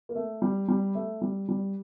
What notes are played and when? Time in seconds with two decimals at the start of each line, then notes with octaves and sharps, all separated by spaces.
0.09 A#3
0.15 A3
0.42 G3
0.68 G3
0.95 A3
1.22 G3
1.49 G3